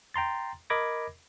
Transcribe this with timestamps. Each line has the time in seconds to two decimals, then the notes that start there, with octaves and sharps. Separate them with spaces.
0.14 G5 A#5 C6 A6
0.70 A#4 D#5 B5 D6 G#6 A#6